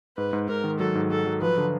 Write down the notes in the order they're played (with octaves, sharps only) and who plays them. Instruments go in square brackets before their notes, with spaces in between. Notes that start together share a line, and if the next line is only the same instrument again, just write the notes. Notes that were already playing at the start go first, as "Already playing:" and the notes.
[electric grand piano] G#2 [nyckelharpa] B4
[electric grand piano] G#2
[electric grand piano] G#2 [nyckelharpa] A#4
[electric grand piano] D#3
[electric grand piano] F#3 [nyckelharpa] A4
[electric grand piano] G#2
[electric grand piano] G#2 [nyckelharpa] A4
[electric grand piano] F#3
[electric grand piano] F3 [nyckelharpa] B4
[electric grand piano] D3